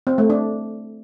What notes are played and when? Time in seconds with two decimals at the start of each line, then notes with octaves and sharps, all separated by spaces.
0.07 C4
0.18 A3
0.30 D4